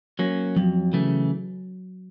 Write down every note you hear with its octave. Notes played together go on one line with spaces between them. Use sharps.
F#3 A#3 C#4
F2 F#3
C#3 E3 A3